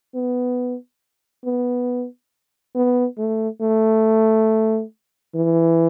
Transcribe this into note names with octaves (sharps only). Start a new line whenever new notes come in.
B3
B3
B3
A3
A3
E3